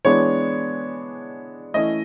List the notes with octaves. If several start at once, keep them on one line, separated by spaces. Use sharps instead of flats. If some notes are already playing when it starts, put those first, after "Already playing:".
E3 G#3 B3 D4 C#5
E3 A3 C#4 E4 D#5